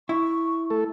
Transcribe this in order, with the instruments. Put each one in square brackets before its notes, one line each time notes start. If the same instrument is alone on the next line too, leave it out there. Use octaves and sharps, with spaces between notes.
[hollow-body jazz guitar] E4 [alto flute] C#6
[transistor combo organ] A3 A4